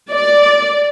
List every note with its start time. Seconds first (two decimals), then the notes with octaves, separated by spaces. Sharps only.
0.12 D5